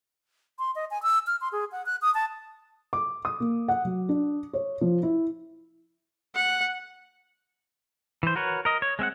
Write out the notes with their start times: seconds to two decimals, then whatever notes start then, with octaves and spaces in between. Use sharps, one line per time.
0.59 C6
0.76 D#5
0.91 G#5
1.03 E6
1.27 F6
1.41 C6
1.52 G#4
1.72 F#5
1.86 F#6
2.02 D#6
2.14 A5
2.93 D6
3.25 D#6
3.40 A#3
3.68 F#5
3.85 F#3
4.09 D4
4.53 C#5
4.81 F3
5.03 E4
6.36 F#5
8.23 E3 C5
8.35 F#4 A#4 B4 C#5
8.65 A#4 D#5
8.82 C#5
8.99 G#3 C4 E5 F#5